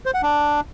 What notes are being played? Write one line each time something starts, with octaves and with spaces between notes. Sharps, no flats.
C5
F#5
D4